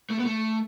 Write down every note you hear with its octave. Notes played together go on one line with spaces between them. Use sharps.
A3
B3
A3